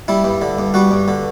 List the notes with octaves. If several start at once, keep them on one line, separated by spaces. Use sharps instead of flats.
G3 E4
G2
D3
G2
G3 F#4
G2
D3